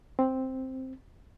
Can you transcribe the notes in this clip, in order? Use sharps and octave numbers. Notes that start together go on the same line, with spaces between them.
C4